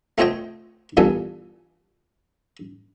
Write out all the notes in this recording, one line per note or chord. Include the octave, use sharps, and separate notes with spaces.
A3 C4 F4 C#5 D#5 G5
E2 G2 A#2 A4 G#5